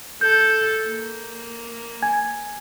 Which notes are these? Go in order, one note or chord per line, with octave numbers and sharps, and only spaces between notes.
A4 G6
A#3
G#5 G#6